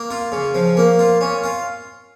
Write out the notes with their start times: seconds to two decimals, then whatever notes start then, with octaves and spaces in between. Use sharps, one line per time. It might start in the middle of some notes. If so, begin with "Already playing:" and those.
Already playing: A#3
0.11 F4
0.32 C#3
0.55 F3
0.77 A#3
0.99 F4
1.21 C#4
1.44 F4